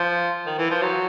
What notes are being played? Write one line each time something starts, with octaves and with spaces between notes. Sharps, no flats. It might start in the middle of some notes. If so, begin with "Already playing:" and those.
Already playing: F3
D#3
E3
F3
F#3